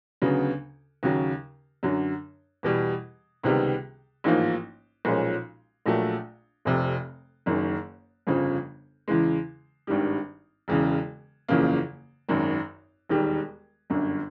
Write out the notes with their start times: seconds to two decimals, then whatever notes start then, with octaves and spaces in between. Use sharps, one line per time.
0.22 D2 C#3 F#3 B3
1.03 D#2 C#3 F#3
1.83 F#2 D3 F#3
2.63 E2 B2 G3
3.43 C#2 C3 D#3 G3 B3
4.24 A1 G#2 F3 A#3 D#4
5.05 B1 A#2 F3 G#3 C#4
5.86 A#1 A#2 F#3 A3
6.65 F1 F2 C3
7.46 F#1 F#2 D#3
8.27 G1 F2 C#3 F3
9.08 E2 C#3 E3 G#3
9.87 G#1 G2 D#3 G3
10.68 E1 E2 C#3
11.49 F#1 E2 C#3 F3 A#3
12.29 G#1 F#2 D#3
13.09 E1 D#2 D#3 G3
13.90 G1 F#2 D3